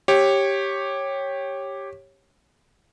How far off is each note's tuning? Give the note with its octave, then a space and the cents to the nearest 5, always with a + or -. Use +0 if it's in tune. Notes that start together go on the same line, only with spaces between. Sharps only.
G4 +0 C#5 -15